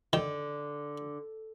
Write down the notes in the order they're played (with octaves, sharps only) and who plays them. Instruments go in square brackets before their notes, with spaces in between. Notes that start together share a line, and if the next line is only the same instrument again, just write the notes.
[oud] D3 [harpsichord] D#3